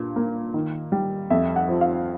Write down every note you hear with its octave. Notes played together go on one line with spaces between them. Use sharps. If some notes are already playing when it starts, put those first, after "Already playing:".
Already playing: G2 A#2
A#3
D#3
G3
F2 E5
F#5
F3
F5